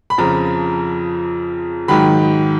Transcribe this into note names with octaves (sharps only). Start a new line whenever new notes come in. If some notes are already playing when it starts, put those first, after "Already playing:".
B5
F2 C#3 F3 A#5
G#2 D#3 F#3 B5